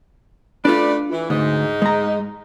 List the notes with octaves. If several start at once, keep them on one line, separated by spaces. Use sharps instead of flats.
A3 D4 F4 B4 D5
E3
D2 G#2 D#4
G#3 A#5